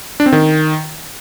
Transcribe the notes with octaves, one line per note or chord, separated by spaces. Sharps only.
D4
C4
D#3